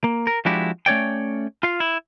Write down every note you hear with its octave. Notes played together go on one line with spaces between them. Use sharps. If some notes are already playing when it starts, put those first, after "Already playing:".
A#3
A#4
F3 G#3 D4 E4 F#4 G4
A3 C#4 C#5 D5 G5
F4 F5
E4